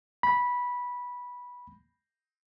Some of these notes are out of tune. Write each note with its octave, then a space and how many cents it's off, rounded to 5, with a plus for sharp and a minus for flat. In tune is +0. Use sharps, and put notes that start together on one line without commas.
B5 -10